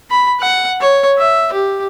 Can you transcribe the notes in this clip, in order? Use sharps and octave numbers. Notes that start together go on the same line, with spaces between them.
B5
F#5
C#5
E5
G4